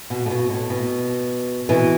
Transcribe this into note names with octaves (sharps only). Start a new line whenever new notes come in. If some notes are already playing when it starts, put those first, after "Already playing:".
B2
A2
B2
A2
B2
B2 E3